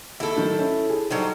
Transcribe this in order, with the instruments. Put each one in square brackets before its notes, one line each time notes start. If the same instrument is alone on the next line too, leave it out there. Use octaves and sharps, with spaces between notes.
[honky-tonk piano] D#2 [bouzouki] E4 A4
[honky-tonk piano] A2 D#3 F#3
C#4
G#4
[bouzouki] F#3 G3 C5 [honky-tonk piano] D#4 A4 D#5